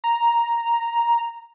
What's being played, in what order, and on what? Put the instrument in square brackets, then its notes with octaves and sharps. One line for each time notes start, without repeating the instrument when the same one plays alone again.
[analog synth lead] A#5